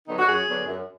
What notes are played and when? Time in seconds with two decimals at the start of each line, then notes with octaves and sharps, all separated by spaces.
0.08 D3 F#3 B3 D#4
0.19 F#4
0.28 F#2 G#4
0.48 D3 F#3 B3 D4
0.67 F#2